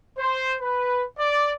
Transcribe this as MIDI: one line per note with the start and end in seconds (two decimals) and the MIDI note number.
0.18 0.55 72
0.61 1.04 71
1.19 1.52 74